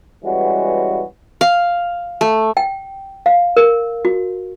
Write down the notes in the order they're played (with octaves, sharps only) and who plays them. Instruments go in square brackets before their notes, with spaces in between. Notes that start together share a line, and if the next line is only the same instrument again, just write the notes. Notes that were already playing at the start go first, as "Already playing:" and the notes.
[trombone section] E3 G3 G#3 B3 C#4 F#4
[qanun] F5
A3
[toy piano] G5
F5
A#4
F#4